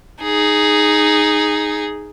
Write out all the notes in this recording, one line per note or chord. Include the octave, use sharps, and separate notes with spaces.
D#4 G#4